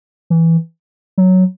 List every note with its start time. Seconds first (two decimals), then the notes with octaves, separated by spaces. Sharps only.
0.30 E3
1.18 F#3